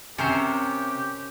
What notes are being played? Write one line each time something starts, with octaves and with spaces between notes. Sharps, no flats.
C3 C#4 G4 A#4 C5